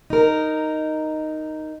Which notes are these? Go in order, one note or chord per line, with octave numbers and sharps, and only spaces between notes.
D#4 A#4